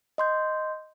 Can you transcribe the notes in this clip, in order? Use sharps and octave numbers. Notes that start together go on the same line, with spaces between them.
D#5 C6 G6